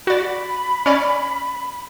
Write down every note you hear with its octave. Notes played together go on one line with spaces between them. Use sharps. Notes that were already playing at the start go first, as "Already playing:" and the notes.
F#4 D5 B5
C#4 D5